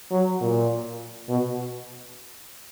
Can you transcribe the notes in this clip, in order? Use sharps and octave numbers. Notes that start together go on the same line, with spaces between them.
F#3
A#2
B2